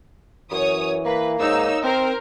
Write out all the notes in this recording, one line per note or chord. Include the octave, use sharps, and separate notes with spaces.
F#2 E3 C#5 D#6
A#3 B4
G#2 D#4 C#5 E6
C4 A#4 C5